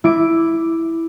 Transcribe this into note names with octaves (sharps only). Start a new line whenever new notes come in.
E4 D6 D7